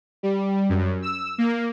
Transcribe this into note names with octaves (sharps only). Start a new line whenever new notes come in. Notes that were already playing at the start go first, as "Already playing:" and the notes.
G3
F#2
E6
A#3